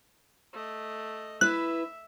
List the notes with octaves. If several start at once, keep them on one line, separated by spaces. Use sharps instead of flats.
A3 D#5
E4 B4 E5 F#6